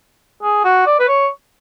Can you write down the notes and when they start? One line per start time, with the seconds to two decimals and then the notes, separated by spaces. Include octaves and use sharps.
0.43 G#4
0.64 F#4
0.86 D5
0.99 B4
1.08 C#5